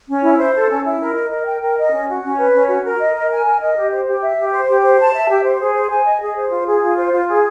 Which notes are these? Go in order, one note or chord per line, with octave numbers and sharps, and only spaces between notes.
C#4
E4
C5
A4
C#4
E4
A#4
D#5
A#4
G5
A#4
D#5
C#4
F#4
C#4
B4
C#4
F#4
A#4
D#5
A#4
G#5
A#4
D#5
G4
C5
G4
E5
G4
C5
G4
C5
A5
E5
G4
C5
G#4
C5
G#5
D#5
G#4
C5
F4
G#4
F4
C5
F4
G#4